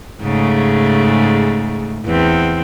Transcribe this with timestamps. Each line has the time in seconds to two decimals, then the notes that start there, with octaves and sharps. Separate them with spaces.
0.21 G#2 C#3 A3
2.05 E2 C4